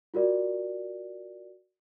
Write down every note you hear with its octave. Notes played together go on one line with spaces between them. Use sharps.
F4 F#4 A#4 D5